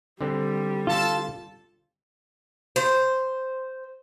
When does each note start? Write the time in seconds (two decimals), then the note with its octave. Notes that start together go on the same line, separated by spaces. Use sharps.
0.21 D3 G3 C4
0.87 F4 A4 A5
2.76 C5